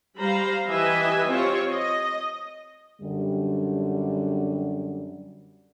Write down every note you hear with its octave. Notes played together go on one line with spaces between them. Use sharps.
G3 C5 F5 A#5 B5
E3 G4 B4 D#5 E5 G#5
C4 F4 G4 C5 C#5
D#5
F#2 D3 G3